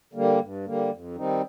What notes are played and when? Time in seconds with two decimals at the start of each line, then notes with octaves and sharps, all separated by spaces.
0.14 D3 G3 A#3
0.40 G2
0.65 D3 G3 A#3
0.91 F2
1.16 D#3 G3 C4 D#4